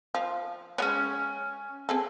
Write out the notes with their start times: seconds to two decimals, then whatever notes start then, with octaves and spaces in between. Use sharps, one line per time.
0.15 F3
0.78 G#3 B3 C#4 C#5
1.89 C4 G#4 A4